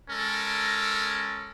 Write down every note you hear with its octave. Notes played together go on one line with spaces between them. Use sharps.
G#3 C#4 A4 A#4